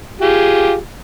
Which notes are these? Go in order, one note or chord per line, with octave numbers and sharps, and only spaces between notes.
F4 G4 G#4